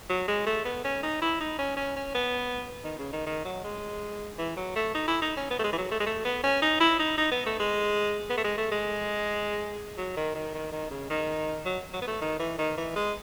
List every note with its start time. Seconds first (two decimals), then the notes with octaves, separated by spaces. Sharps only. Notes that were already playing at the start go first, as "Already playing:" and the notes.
0.10 F#3
0.28 G#3
0.47 A3
0.65 B3
0.84 C#4
1.03 D#4
1.22 E4
1.40 D#4
1.59 C#4
1.77 C#4
1.96 C#4
2.14 B3
2.84 D#3
2.99 C#3
3.13 D#3
3.26 D#3
3.45 F#3
3.64 G#3
4.39 E3
4.57 F#3
4.76 A3
4.95 D#4
5.08 E4
5.22 D#4
5.37 C#4
5.50 B3
5.59 A3
5.64 G#3
5.73 E3
5.78 F#3
5.92 A3
6.00 G#3
6.06 A3
6.25 B3
6.44 C#4
6.62 D#4
6.81 E4
6.99 D#4
7.18 D#4
7.32 B3
7.46 A3
7.60 G#3
8.30 B3
8.38 A3
8.44 G#3
8.58 A3
8.72 G#3
9.98 F#3
10.17 D#3
10.35 D#3
10.54 D#3
10.72 D#3
10.91 C#3
11.10 D#3
11.65 F#3
11.94 F#3
12.02 B3
12.08 A3
12.21 D#3
12.40 E3
12.59 D#3
12.78 E3
12.96 G#3